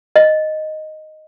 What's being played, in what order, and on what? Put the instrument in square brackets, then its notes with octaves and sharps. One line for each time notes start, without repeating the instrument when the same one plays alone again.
[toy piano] D#5